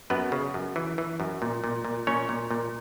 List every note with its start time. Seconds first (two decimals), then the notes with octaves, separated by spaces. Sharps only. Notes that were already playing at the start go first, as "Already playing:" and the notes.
0.10 F#2 B3 B4
0.32 C#3
0.54 F#2
0.76 E3
0.98 E3
1.20 F#2
1.42 A#2
1.64 A#2
1.85 A#2
2.07 A#2 C#4 C#5
2.29 A#2
2.51 A#2